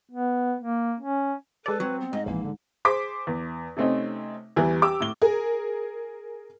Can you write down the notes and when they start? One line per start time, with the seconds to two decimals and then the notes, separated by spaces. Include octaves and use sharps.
0.11 B3
0.61 A#3
1.00 C#4
1.66 G#3 A4 B4 D5
1.80 F#3 C4
2.01 B3
2.13 G#2 D#5
2.26 A#1 F2 E3 A#3
2.43 D3
2.85 G#4 C5 D6 B6
3.27 E2
3.77 C3 A3 C4 C#4 D#4
4.56 E2 E3 G3
4.82 G4 D6 E6
5.00 A2 G7
5.22 G#4 A#4